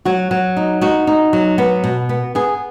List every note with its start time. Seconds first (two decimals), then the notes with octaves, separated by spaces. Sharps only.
0.05 F#3 F#4
0.31 F#3
0.57 D#4
0.81 D#4 F#4
1.07 D#4
1.33 F#3
1.58 B3
1.84 B2
2.09 B3
2.35 B3 G#4